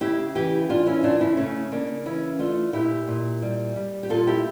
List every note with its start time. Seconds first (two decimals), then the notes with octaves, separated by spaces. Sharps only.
0.01 C#3 E4 G4
0.35 E3 E4 G4
0.69 E3 D4 F4
0.86 C#4 E4
1.03 C#3 D4 F4
1.20 C#4 E4
1.37 C#3 A3 C#4
1.72 C#3 A#3 D4
2.05 E3 C#4 E4
2.39 A3 D4 F4
2.73 A#2 E4 G4
3.07 A#2
3.42 G3
3.76 G3
4.03 G4
4.09 A#2 F4 A4
4.27 E4 G4